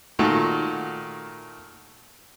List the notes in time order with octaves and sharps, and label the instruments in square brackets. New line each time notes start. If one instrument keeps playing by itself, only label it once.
[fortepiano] A#2 D#3 A3 F#4